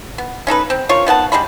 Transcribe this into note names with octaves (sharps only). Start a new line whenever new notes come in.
B3
C#4 D#4 A4 B4
C4
D4 F4 A#4 C#5
D#3 B3 F#5 A5
G3 G#3 D4 B5